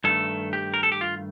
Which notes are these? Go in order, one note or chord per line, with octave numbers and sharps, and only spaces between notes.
G2 D#3 A3 A4
G4
A#4
A4
G4
F4